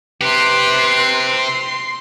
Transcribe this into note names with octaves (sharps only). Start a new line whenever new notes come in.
C4 G4 B4 C6
C6